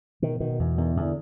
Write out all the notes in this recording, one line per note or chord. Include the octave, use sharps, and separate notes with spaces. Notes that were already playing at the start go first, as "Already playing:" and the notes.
B2 D#3
B2 D#3
E2
E2 D#3
E2 D3